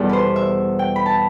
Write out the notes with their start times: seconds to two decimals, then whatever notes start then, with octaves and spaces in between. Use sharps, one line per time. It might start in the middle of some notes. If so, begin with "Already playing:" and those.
Already playing: E2 B2 G3 A4
0.09 B4 C5
0.36 E5
0.79 G5
0.96 B5
1.06 A5